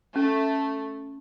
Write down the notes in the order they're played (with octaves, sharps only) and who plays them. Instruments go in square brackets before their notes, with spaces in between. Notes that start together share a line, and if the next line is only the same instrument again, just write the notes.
[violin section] A3 [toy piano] C#4